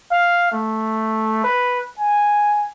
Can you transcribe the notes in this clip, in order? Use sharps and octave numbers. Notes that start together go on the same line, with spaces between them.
F5
A3
B4
G#5